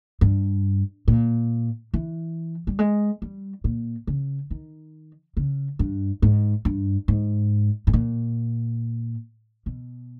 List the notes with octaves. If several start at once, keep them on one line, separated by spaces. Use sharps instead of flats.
G2
A#2
E3
G3
G#3
G3
A#2
C#3
D#3
C#3
G2
G#2
G2
G#2
G#2
A#2
B2